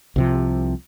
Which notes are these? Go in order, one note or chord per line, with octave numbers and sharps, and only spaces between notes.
C2 C3 F3